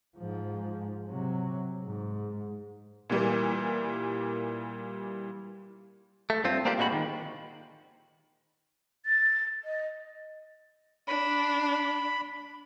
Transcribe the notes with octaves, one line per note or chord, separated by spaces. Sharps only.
G#2 F3
C3 F#3
G#2
A#2 E3 G3 A#3
A3
G2 C4 F4
A#3 C4 D4 F4 G4
A#2 G#3 C4 F#4 B5
D#3
A6
D#5
D4 B5